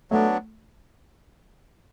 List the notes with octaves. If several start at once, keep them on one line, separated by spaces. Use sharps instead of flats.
F#3 A3 B3 D4